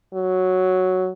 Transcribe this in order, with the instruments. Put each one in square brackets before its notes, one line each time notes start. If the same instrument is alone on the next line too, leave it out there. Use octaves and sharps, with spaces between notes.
[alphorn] F#3